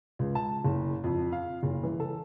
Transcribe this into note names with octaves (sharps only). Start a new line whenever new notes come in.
C#2
A5
F#1
F2
F5
F#1
E3
A4